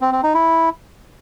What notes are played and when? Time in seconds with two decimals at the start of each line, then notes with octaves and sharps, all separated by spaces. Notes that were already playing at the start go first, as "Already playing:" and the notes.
0.01 C4
0.12 C4
0.23 D#4
0.34 E4